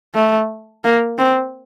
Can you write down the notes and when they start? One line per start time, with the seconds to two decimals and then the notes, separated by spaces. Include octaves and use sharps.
0.15 A3
0.84 A#3
1.18 C4